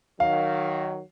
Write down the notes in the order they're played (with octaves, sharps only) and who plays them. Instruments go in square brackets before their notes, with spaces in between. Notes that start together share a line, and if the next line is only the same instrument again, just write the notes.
[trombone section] D#3 F#3 [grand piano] F5